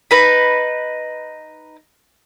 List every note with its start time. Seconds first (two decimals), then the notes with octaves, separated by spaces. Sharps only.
0.11 D#4 B4 B5